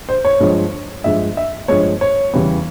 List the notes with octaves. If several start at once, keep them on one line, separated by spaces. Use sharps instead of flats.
C5
C#5
G2 F3 G#3
G2 F3 G#3 E5
E5
G2 F3 G#3 C#5
C#5
E2 C#3 E3 G3